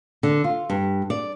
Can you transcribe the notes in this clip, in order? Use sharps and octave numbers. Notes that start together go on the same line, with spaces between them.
D3
F4
G2
D5